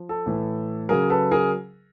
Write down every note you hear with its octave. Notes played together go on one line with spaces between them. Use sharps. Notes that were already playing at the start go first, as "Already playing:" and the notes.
Already playing: F3
A4
A2 E3
C#3 F#3 G#4 A#4
A4 B4
G#4 A#4